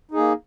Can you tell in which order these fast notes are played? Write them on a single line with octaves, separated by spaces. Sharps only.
D#4 G#4 A#3